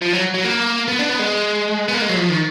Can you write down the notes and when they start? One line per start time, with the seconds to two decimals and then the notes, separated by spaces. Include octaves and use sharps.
0.02 F3
0.13 F#3
0.34 F#3
0.44 A#3
0.88 B3
0.99 D4
1.09 B3
1.19 G#3
1.88 B3
1.94 A#3
2.02 G#3
2.09 F#3
2.16 F3
2.30 D#3